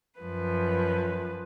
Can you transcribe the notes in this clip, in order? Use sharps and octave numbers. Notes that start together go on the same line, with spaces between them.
F#2 F3 B4